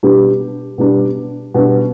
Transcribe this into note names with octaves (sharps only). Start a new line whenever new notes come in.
B2 G3 D4 G4
B2 G3 D4 G4
B2 G3 D4 G4